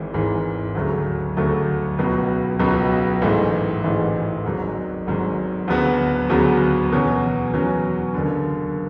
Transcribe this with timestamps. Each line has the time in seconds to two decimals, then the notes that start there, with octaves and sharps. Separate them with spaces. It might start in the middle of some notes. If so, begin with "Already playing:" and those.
Already playing: G#1 G#2 E3
0.14 G#1 G#2 E3
0.75 D2 C#3 F#3 A3
1.37 D2 C#3 F#3 A3
1.98 C#2 B2 F#3
2.60 C#2 B2 F#3
3.22 A1 G#2 E3 A3
3.83 A1 G#2 E3 A3
4.44 G#1 G#2 F#3
5.07 G#1 G#2 F#3
5.68 D2 C#3 F#3 B3 F#4
6.29 D2 C#3 F#3 B3 F#4
6.91 E2 B2 F#3 C#4
7.54 E2 B2 F#3 C#4
8.14 F#1 F#2 D3